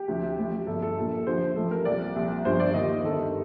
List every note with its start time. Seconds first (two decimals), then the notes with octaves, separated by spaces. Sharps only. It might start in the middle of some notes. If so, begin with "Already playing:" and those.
Already playing: G4
0.08 D2 C3 F3
0.37 A1 A2 F3
0.67 G1 G2 F3 A4
0.82 A4
0.96 A#1 A#2 F3
1.26 D#2 D3 F3 C5
1.56 A1 A2 F3 A4
1.71 A#4
1.85 C2 A#2 F3 D5
2.16 C2 A#2 F3
2.45 G1 G2 F3 C5
2.60 D5
2.74 D#2 D#3 D#5
3.04 G1 G2 D#3 A4